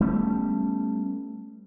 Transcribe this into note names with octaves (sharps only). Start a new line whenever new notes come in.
G3 A3 B3 C#4